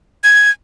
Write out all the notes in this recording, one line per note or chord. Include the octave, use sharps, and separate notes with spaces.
G#6